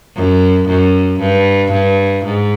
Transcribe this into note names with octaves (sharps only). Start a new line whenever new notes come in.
F#2
F#2
G2
G2
G#2